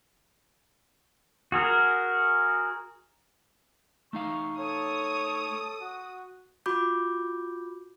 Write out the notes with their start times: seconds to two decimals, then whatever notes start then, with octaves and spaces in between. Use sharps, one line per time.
1.52 F#4 G#4 A#4
4.13 A3 D#4 F5 C#6
4.59 A4 C#5 D#6
5.80 F#4
6.66 F4 F#4 B5 D6 G6